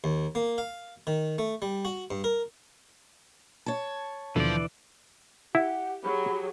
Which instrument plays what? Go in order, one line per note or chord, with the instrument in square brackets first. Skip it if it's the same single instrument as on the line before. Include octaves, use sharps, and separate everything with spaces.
[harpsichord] D#2
A#3
F5
D#3
A3
G3
F#4
G2
A#4
[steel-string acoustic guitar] C#5 A5
[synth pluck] D#2 B2 D3 [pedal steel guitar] E3 D5 [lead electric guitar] F3
[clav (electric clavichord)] E4 [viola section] G4 [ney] F#5
[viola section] F#3 G4 G#4 [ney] B5